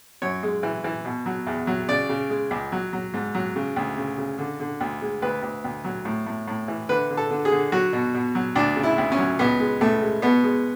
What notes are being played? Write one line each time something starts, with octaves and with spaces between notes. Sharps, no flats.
F#2 C#5
G#3
E3
E3
B2
F#3
E2
F#3
C#3 D5
C#3
G#3
C#2
F#3
F#3
G#2
F#3
C#3
D2
C#3
C#3
D3
D3
D2
G#3
D2 B4
D2
D2
F#3
A2
A2
A2
E3
D3 B4
D3
A4
D3
G#4
D3
F#3 F#4
B2
B2
F#3
D2 D4
C#3
E4
D2
C#4
F#3
C#2 B3
G#3
C#2 A3
G#3
B2 B3
G#3